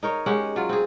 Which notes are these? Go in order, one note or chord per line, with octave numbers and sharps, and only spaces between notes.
D#4 A#4 C#5
G#3 C#4 G4 F#5
F#3 F4
C4 G#4